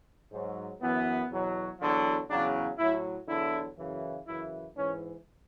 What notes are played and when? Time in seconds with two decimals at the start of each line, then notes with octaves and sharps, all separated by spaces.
0.31 G#2 F#3
0.80 F#2 E3 B3
1.30 E2 B2 F#3
1.79 E2 D3 F#3
2.29 E2 C#3 F#3 D4
2.77 A2 F#3 E4
3.27 E2 D3 F#3 E4
3.77 F#2 C#3 E3
4.26 F#2 C#3 E3 E4
4.75 G#2 E3 C#4